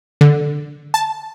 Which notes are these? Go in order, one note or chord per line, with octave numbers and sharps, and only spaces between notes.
D3
A5